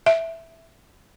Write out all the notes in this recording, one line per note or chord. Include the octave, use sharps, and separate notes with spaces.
E5